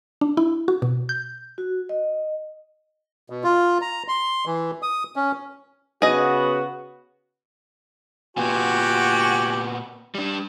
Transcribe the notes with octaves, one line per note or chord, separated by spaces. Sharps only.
D4
E4
F#4
B2
G6
F#4
D#5
B2
F4
A#5
C6
E3
D#6
C#4
C#3 B3 F#4 G#4 D#5
A#2 B3 F#4 G4 G#5
G3 D4